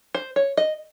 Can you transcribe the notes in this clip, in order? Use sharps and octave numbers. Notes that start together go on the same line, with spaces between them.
C5
C#5
D#5